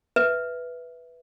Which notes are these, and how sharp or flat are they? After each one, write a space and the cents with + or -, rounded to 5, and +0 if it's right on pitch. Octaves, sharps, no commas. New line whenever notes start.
B4 +0 E5 +0